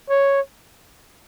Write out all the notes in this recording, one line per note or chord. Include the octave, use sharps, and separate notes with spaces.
C#5